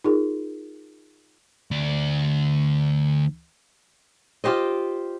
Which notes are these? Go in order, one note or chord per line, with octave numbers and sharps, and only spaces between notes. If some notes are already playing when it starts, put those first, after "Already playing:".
D#4 F4 G#4 A#4
D2 D5
F4 G4 C5 D#5